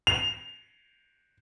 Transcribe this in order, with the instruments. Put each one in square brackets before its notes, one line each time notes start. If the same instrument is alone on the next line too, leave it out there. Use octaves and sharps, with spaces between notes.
[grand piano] F7